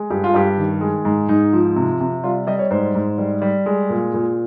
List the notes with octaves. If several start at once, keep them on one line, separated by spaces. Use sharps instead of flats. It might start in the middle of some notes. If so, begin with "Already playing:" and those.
Already playing: G#3
G2 G4
F4
G2 G4
D#3
G#3
G#2
G#2 D#4
F3
C3
C3
G3 F4
G3 D#5
C#5
G#2 C5
G#2
G3
G3
G#3
A#2
A#2